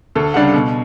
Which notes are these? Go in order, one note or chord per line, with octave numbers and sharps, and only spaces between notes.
D2 A4
C#3 G3 D4 F#5
B2